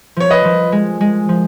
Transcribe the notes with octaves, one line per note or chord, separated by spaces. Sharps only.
F3 C#5
B4 D#5
F3
G#3
G#3
F3